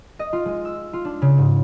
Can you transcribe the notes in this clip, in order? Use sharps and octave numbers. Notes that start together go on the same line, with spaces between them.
D#5
F4
G#3
E6
F4
D4
C#3
G#2